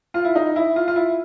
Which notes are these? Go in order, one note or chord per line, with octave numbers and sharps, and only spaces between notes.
F4
E4
D#4
E4
F4
F4
E4